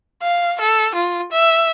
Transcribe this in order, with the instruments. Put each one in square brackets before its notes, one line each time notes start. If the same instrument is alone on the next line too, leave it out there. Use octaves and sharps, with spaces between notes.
[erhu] F5
A4
F4
E5